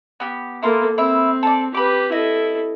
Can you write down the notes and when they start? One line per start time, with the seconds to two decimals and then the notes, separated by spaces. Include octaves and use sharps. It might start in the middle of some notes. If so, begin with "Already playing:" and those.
0.20 B3 G4
0.63 A#3 E4 F4 A4 A#4
0.98 C4 E4 E5
1.43 A4 D5
1.75 G4 B4 B5 D6
2.12 E4 A4 D#5